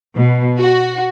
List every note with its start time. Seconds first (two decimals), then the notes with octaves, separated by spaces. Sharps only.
0.17 B2
0.60 F#4